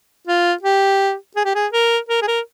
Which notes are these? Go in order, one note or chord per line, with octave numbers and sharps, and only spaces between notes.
F4
G4
G#4
G4
G#4
A#4
A#4
G#4
A#4